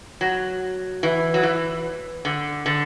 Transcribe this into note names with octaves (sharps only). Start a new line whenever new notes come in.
F#3
E3
F#3
E3
D3
D3